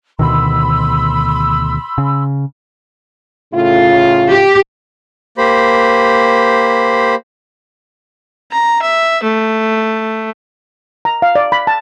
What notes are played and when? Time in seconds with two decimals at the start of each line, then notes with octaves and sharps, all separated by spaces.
0.19 D2 B2 D#3 B5 C6 E6
1.98 C#3
3.54 A2 C#3 F4
4.30 G4
5.38 A#3 G4 C5 B5
8.52 A#5
8.82 E5
9.23 A3
11.05 A#5
11.22 F5
11.35 D5
11.52 B5
11.67 A5